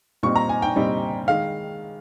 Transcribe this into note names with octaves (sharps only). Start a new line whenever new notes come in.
A#2 G3 C4 D#4 C#6
A#5
G#5
G5
A#2 G3 C4 D#4
D#3 G#3 F5